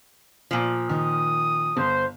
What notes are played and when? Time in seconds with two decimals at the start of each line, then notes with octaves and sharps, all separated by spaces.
0.51 A#2 F3
0.89 D#3 D#6
1.77 G1 C5